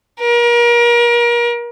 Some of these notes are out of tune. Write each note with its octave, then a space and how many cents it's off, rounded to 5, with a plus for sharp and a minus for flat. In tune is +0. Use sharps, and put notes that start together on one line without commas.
A#4 +35